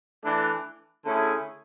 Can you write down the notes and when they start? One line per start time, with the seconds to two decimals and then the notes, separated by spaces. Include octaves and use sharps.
0.23 E3 A3 D4
1.05 D3 A3 C#4 E4 G#4